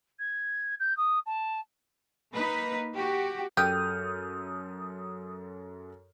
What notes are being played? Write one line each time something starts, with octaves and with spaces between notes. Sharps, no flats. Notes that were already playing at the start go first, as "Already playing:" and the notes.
G#6
G6
D#6
A5
A#3 D#4 B4
F#4 G4
F#2 G4 A4 D#6 F6 G6